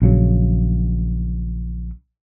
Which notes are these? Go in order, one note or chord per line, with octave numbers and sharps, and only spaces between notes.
A#1 C#3 F#3